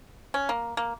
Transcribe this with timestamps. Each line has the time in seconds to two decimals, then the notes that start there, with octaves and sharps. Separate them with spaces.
0.34 C#4
0.49 A#3
0.77 A#3